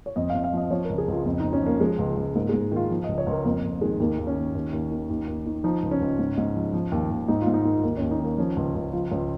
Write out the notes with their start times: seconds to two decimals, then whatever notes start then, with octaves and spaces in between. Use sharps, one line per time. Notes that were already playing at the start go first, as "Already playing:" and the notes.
0.06 C#5
0.16 F2 D#5
0.30 F2 F5
0.44 F5
0.53 F3 D#5
0.71 F3 C#5
0.85 C#2 A#4
0.98 G#4
1.08 C#2 F4
1.26 F2
1.40 F2 D#4
1.53 C#4
1.62 F3 A#3
1.81 F3 G#3
1.98 C#2
2.17 C#2
2.35 G#2 A#3
2.49 G#2 G#3
2.72 D#3 F4
2.90 F3
3.04 C#2 D#5
3.18 C#5
3.27 C#2 A#4
3.45 F2 A#3
3.63 F2
3.81 D#3 G#3
4.00 D#2 A#3
4.18 D#2
4.27 C#4
4.37 D#3
4.55 D#2
4.73 D#2
4.92 D#3
5.10 D#2
5.28 D#2
5.46 D#3
5.64 F3 D#4
5.83 C#2
5.91 C#4
6.01 C#2
6.19 G#2
6.37 G#2
6.55 F3
6.73 F3
6.92 D#2
7.11 D#2
7.28 G#2 D#4
7.41 F4
7.47 G#2
7.54 D#4
7.65 D#3
7.83 D#2 A#3
7.97 D#2 C#4
8.11 D#4
8.20 D#3 A#3
8.38 F3 C#4
8.57 C#2
8.75 C#2
8.93 F3 F4
9.11 C#2 C#4